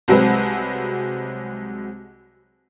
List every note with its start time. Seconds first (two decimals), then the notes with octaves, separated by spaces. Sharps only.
0.08 C2 F#3 G#3 C4 B4